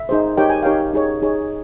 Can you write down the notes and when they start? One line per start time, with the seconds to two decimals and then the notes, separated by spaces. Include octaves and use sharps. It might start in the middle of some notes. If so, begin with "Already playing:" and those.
Already playing: E5
0.09 D#4 G#4 C5
0.37 D#4 G4 A#4 C#5 G5
0.50 G#5
0.62 D#4 G4 A#4 C#5 F5 G5
0.93 D#4 G#4 C#5
1.22 D#4 G#4 C#5